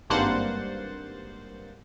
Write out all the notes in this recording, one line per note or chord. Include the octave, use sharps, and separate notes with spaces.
G#1 G2 A#3 C5 F#5 A6